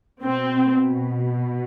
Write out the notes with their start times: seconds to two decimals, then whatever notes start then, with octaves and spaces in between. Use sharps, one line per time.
0.24 B2 C4